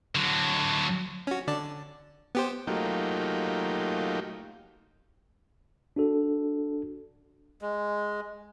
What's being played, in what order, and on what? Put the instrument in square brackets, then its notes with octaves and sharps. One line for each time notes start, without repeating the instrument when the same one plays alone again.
[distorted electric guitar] D3 F#3
[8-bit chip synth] C#4 F#4
D3 D5 A5
B3 G4 C5
[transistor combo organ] F#3 A3 A#3 D#4 F4 G4
[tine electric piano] D4 F#4 A4
[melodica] G#3